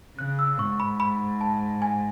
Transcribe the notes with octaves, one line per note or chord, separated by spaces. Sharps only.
C#3 F#6
E6
G#2 C#6
B5
B5
A5
G#5